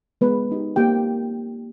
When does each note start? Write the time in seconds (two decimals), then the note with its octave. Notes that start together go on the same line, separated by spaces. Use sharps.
0.21 G#3 B3 B4
0.50 B3 D#4 G4
0.76 A#3 G4 G5